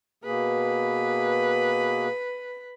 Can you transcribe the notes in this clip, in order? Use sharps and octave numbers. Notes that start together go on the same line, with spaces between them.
B2 A#3 G#4 B4